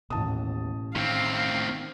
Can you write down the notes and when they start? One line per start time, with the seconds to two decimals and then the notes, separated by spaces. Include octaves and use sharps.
0.10 A1 D#2 B2 A5 D#6
0.96 A2 D#3 C4 F5